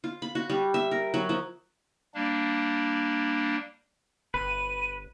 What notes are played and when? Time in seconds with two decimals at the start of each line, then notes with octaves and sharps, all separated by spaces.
0.04 F4
0.22 B5
0.35 F#4
0.50 G3
0.74 E5
0.91 A#4
1.14 F#3
1.29 F3
2.15 G3 A#3 D4
4.34 G1 B4 D#7